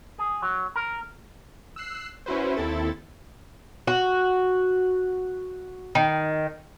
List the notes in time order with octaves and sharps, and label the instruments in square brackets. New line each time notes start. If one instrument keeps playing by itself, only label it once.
[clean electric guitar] G#4
F#3
A#4
[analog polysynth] E6 F#6 C7
C#4 E4 F#4 B4 C5
D#2 C4 E4 A4 A6
[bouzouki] F#4
D#3